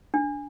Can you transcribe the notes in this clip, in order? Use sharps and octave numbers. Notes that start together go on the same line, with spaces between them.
D4